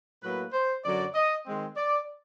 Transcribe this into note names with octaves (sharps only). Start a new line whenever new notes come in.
A2 F#3 A#3 B4
C5
F#2 D3 F#3 D5
D#5
D#3 G#3 C4
D5